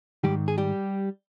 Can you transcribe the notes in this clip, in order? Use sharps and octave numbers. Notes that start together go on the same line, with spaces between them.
G#2 D#3 G3 G4
G#4
G3 G4